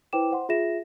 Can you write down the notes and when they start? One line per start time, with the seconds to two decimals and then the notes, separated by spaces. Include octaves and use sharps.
0.13 E4 B4 C5 G5 D6 E7
0.31 C5 F#5 C6
0.49 F4 G#4 E5 A#6 E7